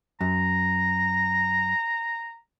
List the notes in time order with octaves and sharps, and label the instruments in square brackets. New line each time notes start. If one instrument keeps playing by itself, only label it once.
[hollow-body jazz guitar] F#2 [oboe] A#5